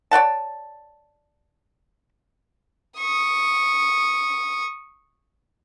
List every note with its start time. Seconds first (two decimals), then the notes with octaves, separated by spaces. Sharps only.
0.11 C#5 D5 F#5 A5
2.99 C#6 D#6